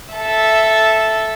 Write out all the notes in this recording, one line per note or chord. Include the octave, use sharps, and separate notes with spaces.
A4 E5